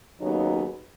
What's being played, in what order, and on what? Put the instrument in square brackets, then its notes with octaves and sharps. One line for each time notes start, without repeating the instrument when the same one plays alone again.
[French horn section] D#2 C#3 F#3 B3 D#4